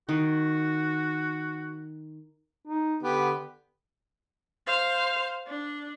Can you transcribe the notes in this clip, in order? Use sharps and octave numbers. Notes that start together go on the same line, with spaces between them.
D#3 F#4
D#4
D3 B3 G4
C5 F5
D4